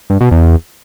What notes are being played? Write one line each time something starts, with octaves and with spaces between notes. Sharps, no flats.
G2
B2
E2